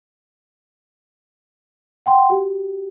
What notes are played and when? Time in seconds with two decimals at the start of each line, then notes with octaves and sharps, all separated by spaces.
2.06 F#5 G5 C6
2.30 F#4 G4